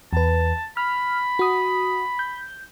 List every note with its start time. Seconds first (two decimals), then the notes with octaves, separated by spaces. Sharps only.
0.13 E2 B4 A5
0.77 B5 F6
1.39 F#4 D#6
2.19 G6